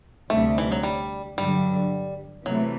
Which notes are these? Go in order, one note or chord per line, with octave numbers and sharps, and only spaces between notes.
D2 C3 G3 A3
E3
F#3
G3
G2 D3 F#3 G3
C3 E3 F#3 A3